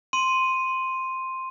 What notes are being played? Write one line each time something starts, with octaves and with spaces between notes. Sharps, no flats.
C6 D#7